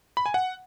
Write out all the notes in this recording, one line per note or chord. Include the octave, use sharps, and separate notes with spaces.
B5
G#5
F#5